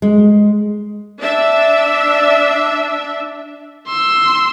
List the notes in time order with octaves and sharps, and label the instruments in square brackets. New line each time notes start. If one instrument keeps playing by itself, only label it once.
[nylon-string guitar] G#3
[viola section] D4 E5
[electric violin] C6 E6